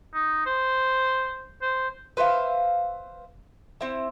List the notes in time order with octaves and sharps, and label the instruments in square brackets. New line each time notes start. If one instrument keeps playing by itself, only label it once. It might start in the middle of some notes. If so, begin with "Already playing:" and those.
[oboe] D#4
C5
C5
[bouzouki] B4 C5 E5 F5
C4 E4